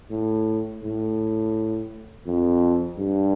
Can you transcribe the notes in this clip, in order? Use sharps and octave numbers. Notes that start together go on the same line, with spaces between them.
A2
A2
F2
G2